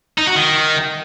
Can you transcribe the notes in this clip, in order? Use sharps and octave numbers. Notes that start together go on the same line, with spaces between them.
D#4
F#4
D#3